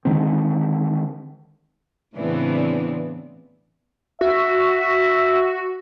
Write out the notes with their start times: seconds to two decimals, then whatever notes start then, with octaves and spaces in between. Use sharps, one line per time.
0.05 D3 D#3 G#3 C4
2.16 A2 C#3 E3 B3 C4 D4
4.21 F#4 E5